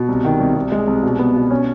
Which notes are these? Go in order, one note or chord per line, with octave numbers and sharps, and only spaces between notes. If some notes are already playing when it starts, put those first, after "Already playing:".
Already playing: B2
C2
D#3
C2
C2
G#3
C2
B2
B3
B2
C#4